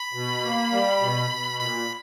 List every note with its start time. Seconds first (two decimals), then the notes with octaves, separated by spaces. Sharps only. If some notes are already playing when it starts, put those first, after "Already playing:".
Already playing: B5
0.13 B2
0.42 A#3
0.72 G3
1.01 B2
1.31 B2
1.60 A#2 B5